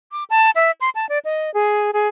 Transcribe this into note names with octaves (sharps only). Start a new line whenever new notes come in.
D6
A5
E5
C6
A5
D5
D#5
G#4
G#4